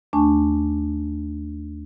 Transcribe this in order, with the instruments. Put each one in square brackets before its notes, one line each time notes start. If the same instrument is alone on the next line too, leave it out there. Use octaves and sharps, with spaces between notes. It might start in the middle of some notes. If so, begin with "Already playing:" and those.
[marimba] D#2 A3 D4 G#5 A5 C#6